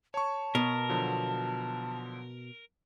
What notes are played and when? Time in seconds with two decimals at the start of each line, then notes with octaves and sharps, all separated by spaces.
0.14 C#5 A5 C#6
0.55 B2 A#4
0.89 D3 F3 F#3